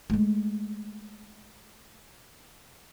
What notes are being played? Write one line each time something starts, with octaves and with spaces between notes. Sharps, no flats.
G#3 A3